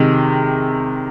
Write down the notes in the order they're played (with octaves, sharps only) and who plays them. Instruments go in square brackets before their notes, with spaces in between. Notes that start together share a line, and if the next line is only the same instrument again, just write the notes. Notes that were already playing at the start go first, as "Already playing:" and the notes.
Already playing: [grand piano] C3 D#3 G#3